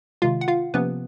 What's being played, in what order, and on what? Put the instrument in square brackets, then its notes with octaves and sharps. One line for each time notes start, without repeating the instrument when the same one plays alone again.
[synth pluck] C3 D#3 G#3 F4 F5
F#5
F4 F5
C3 F3 A#3 B3 C#4 B4